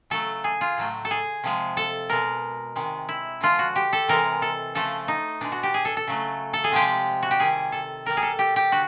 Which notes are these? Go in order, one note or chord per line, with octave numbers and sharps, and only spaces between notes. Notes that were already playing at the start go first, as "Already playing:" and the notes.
C#3 F#3 A3 A4
G#4
F4
A2 F#3 A3
A4
G#4
C3 F3 G#3
A4
B2 G#3 A#4
C3 D#3 G#3
E4
D3 F3 G#3 F4
F#4
G4
A4
C3 E3 G#3 A#4
A4
C#3 F3 A3 A4
D#4
B2 G#3 D4
F#4
G4
G#4
A4
A4
C#3 F#3 A3
A4
G#4
C3 F3 G#3 G4
F#4
G4
C3 D#3 G3 G#4
A4
B2 G3 A#4
G#4
A4
G4
G4
D3 F#4